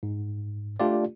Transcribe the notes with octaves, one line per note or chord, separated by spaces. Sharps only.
G#2
A3 D4 F4 G4 D5